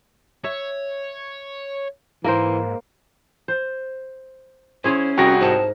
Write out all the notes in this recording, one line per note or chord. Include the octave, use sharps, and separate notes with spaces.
C#5 E5
G#2 E3 A#3 A#4 C5
C5
E2 C#4 E4 G#4 C5 C#5
C2 F#4 G#4 A#4 F#5 G5 A#6
G#2 A5